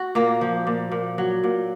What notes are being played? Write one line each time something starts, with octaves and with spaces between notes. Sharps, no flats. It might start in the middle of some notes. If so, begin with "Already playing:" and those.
Already playing: F#4
A#2 A#3
F3
A#2
A#2
F#3
A#2